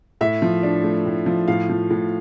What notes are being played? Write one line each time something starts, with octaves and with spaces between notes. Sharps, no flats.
A2 E5
F3
D4
A3
A2
F3
A2 F5
F3
A2